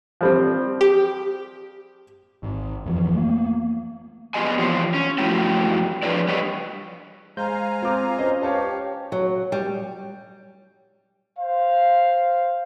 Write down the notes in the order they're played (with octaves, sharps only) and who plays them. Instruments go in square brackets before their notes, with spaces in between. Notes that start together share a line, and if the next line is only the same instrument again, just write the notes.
[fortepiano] F3 G3 C4
[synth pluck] G4
[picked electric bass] G#1
F2 E3 F3
A3 A#3
[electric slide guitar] B3 F4 G4 G#4 D#5 G#5
E3 F3 F4 G4 C5 C#5
C#4
G2 F3 A3 E4 F#4 G4
F3 D4 G#4 B4 C#5 D5
G3 G4 B4 C#5 D#5
[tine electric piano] G#3 C5 G6 [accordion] F5 G#5 A#5
[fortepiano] C4 D6 [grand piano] F4
[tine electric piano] C#4 [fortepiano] C5 D#5
[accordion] G4 [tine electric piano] B4 [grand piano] C#5 F5 A5
[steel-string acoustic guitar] F#3
G3
[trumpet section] C5 F5